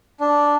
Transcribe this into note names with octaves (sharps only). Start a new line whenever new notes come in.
D4